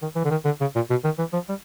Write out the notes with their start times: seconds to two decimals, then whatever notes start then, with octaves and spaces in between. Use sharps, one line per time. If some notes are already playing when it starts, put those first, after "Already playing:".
0.02 D#3
0.16 E3
0.25 D3
0.31 D#3
0.45 D3
0.61 C#3
0.76 A#2
0.90 B2
1.04 D#3
1.18 E3
1.33 F3
1.49 G3